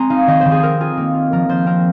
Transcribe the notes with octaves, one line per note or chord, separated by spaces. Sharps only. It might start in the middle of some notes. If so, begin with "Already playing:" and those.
Already playing: G#3 C4 G#5 A#5 C6
D#4 F5
D#3 D#5
D#3 C5
G#4
C4 A#4
F4 G#4
A#3
F4
F3 A#4
F3 C5
C4 A#4